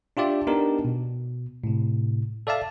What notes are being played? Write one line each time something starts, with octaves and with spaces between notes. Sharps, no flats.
D4 F4 G4 D5 E5
B3 D4 D#4 G4 A#4
B2
A2 C3
A4 D5 E5 F5 A5